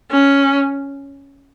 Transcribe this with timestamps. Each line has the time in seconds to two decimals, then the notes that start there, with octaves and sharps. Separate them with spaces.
0.11 C#4